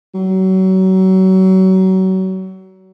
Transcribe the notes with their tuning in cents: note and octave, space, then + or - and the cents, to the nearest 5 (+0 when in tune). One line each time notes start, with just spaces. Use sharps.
F#3 +30